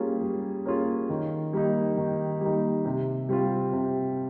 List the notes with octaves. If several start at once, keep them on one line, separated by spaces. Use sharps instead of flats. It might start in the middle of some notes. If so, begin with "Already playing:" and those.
Already playing: G3 A#3 C#4 F4 G#4
G3
A#3 C#4 F4 G#4
D#3
G3 A#3 D#4
D#3
G3 A#3 D#4
C3
G3 C4 F4
C3